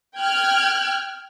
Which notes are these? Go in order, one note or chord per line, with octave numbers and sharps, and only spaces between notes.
G5 F6 F#6 G#6